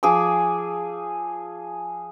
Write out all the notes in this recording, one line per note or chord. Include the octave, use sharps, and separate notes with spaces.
F3 G#4 D6 E6